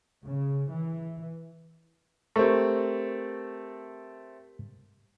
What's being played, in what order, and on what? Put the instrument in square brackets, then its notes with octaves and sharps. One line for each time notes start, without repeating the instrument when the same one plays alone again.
[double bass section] C#3
E3
[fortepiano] A3 C4 [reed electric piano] G4 A#4 C#6